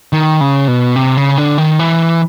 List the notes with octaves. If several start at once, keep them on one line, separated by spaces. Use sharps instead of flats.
D#3
C#3
B2
C3
C#3
D3
D#3
E3